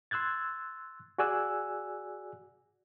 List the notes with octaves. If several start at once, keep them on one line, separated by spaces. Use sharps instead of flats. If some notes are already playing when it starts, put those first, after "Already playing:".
C6 E6 F#6 G#6 A6
F#4 G#4 D5 G#5 E6 F#6